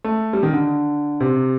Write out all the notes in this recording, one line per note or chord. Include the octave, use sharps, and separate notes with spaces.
A3
G3
D#3
D3
C3